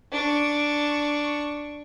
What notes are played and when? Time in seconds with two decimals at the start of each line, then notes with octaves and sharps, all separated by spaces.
0.12 D4 C#6